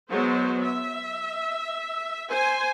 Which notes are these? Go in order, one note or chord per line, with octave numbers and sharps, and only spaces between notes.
F#3 G#3 B3 C5
E5
C5 G#5